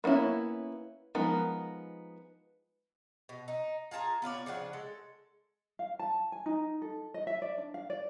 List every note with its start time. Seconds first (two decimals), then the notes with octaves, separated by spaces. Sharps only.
0.04 A#3 B3 C#4 E4
1.15 F3 G#3 B3 D#4 A#4
3.29 B2
3.48 D#4
3.91 F4 G#4 A5 A#5
4.22 B3 F4 C#5 D5
4.46 C#3 F3 D4 F#5
4.73 G#3 A4
5.79 F5
5.99 A5
6.32 G#5
6.46 D#4
6.82 A4
7.14 D#5
7.27 E5
7.42 D5
7.58 D4
7.74 F5
7.90 D5